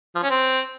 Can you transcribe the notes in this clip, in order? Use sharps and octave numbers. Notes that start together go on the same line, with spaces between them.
F3
C#4
C4